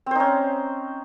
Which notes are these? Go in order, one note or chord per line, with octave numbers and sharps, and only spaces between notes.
C4 C#4 D#4 C5